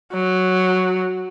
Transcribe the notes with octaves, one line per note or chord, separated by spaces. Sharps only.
F#3